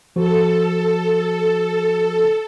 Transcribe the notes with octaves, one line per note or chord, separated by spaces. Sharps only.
F3 F#4 A4 C5